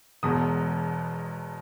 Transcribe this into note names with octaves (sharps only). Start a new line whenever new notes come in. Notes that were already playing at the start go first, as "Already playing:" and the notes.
E1 E2 B2 G#3 D#6